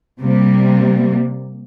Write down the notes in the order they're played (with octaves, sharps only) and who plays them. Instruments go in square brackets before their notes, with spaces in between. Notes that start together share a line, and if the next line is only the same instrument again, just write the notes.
[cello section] C3 G3 A#3